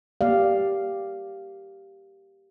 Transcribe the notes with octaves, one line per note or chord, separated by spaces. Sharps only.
A#3 G4 D5 F5